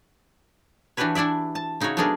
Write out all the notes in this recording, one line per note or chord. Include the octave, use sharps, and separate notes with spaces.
E3 D4 F#4 G4 B4 C#5
E3 D4 E4 D5 E5
A5
C#3 D#4 E4 F#4 C#5
F#3 A3 B3 D4 G#4 A#4